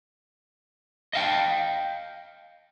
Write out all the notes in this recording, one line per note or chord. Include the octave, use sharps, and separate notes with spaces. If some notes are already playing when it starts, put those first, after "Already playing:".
D#5 F5 G5